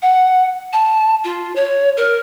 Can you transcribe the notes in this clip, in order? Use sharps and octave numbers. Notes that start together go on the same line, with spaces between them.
F#5
A5
F4
C#5
A#4